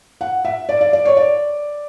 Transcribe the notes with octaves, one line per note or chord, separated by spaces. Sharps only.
F#5
E5
D5
D5
D5
C#5
D5